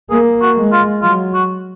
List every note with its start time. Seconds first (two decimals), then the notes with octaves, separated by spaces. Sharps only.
0.10 A#3 G#4
0.42 F#4
0.56 G#3
0.72 F4
1.02 F#3 F4
1.34 F#4